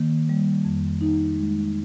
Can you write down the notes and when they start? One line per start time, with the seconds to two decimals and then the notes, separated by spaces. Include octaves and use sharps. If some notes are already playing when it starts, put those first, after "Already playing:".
Already playing: D#3 A#3
0.29 G3
0.65 F2
1.01 D#4
1.36 G#3